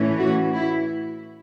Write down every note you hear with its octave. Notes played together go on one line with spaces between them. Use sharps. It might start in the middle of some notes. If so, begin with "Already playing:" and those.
Already playing: A2 E3 A3 C#4
F#4
E4